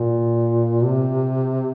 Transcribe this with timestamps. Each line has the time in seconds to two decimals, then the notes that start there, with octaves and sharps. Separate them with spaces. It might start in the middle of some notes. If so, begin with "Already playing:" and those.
Already playing: A#2
0.83 C3